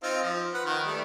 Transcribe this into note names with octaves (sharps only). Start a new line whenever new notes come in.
C4 D#4 F4
F3
B4 F#5
D#3
G3 A3